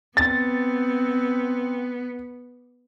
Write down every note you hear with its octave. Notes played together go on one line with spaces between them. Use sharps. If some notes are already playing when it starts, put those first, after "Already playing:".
B3 C4 A6